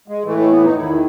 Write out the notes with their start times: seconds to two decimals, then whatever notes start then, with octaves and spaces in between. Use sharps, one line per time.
0.08 G#3
0.25 A2 E3 A3
0.38 A3
0.51 B3
0.64 D#4
0.76 E2 D#3 E4